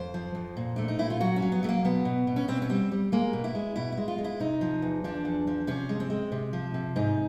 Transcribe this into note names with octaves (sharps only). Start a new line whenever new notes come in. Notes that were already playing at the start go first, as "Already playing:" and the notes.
Already playing: F2 C5
F3
F2
A#2
A3 D4
D#4
A#2 E4
F4
F#3 F#4
C#4
F#3
B3
F#3 A3
A#3
B2 B3
B2
B2
C#4
B2 C4
C#4
G3 C4
G3
G#3 A#3
B2
E4
G#3
B2 E4
E4
G#3
F4
G#3
E4
C3 D#4
F3
E2
F3 D4
E2
F3
C3 C#4
G#3
C4
G#3
C3
F3
C3
G#2 D#4